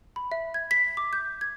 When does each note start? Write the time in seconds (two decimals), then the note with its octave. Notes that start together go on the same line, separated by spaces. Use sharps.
0.16 B5
0.32 E5
0.54 G#6
0.71 B6
0.97 D6
1.13 G6
1.41 G#6